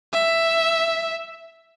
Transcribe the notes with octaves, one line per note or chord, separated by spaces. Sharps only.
E5